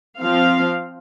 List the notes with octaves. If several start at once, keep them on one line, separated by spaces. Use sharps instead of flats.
F3 C4 F5